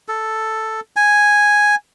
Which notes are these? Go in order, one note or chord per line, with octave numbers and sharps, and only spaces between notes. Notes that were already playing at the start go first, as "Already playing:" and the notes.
A4
G#5